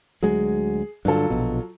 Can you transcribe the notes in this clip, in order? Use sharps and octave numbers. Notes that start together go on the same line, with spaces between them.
D2 F#3 G#3 G#4
G2 D3 F#3 F4 A4
A#1 B2